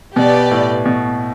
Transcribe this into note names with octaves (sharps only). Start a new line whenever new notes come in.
B2 G4 B4 D5
A2
B2